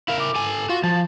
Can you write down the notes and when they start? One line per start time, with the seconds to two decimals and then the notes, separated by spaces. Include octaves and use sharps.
0.08 E4 A#4 F5
0.20 D6
0.35 A4 G#5
0.69 F4 F#4
0.83 F3 A5